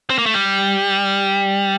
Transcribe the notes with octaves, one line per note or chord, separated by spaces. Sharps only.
C4
A#3
A3
G3